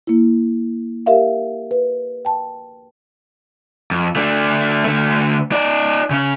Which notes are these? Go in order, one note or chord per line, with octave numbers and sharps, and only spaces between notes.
A#3 E4
G4 A#4 E5 F5
B4
G5 A5
F2
A3 D4
D3 A3
D#4 D5
C#3 C#4